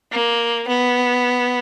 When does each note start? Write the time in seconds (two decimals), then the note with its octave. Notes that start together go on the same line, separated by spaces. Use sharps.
0.12 A#3
0.68 B3